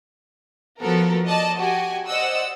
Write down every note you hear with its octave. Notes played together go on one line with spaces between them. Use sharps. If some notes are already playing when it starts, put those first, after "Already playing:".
F3 B3 F#4 A4 A#4
D5 D#5 A5
F#4 G4 G#5
C5 D5 D#5 F#5 E6